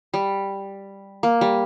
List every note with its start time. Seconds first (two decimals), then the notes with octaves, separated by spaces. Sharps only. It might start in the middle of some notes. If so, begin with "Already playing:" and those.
0.14 G3
1.23 A#3
1.41 G3